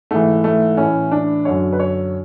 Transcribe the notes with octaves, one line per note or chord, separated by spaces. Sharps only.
G#2 E3 A3
A3
A2 E3 C#4
D4
F#2 D3 C#5
B4
C#5